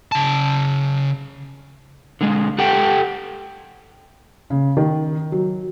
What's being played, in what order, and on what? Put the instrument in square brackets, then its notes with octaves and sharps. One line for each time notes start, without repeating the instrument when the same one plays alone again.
[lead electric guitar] C#3 A5
[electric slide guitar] D3 G#3
G4 A4 F#5 G5
[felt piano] C#3
D#3
F#3